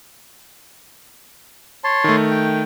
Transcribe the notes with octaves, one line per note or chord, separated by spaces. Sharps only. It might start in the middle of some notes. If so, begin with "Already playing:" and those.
C#5 A5 C6
D#3 A3
G5